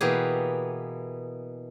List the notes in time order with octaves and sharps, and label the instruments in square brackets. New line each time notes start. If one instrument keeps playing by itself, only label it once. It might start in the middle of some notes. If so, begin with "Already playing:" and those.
[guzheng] B2 E3 A#3 B3 G4 G#4